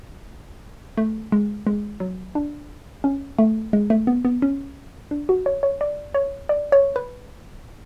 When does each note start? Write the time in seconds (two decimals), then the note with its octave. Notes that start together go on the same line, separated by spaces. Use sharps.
0.98 A3
1.32 G#3
1.67 G#3
2.00 F#3
2.35 D4
3.04 C#4
3.39 A3
3.73 G#3
3.90 A3
4.07 B3
4.25 B3
4.42 C#4
5.11 D4
5.29 F#4
5.46 C#5
5.63 C#5
5.81 D5
6.15 C#5
6.49 D5
6.72 C#5
6.96 B4